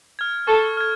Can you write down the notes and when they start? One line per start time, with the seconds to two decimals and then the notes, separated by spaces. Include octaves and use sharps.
0.19 F6 G#6
0.47 A4 C#6
0.77 F6 G#6